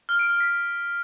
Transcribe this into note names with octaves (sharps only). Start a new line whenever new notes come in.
F6
D7
F6
B6